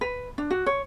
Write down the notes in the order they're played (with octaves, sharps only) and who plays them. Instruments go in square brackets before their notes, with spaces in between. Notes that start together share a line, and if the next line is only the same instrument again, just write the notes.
[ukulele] B4
D4
F#4
C#5